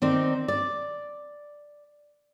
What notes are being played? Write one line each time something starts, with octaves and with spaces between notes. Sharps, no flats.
D#3 C4 D#4 D5
D5